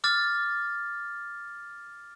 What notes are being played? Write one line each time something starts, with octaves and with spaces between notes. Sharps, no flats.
D6 F6 A6